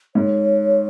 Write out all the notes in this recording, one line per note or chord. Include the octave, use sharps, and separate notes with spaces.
G#2 C#5